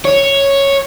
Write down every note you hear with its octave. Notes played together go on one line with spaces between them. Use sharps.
C#5